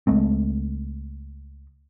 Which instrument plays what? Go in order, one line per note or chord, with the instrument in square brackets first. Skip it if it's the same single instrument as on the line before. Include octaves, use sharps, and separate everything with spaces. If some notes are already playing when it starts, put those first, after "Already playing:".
[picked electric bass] C#2 G#3 A3 C4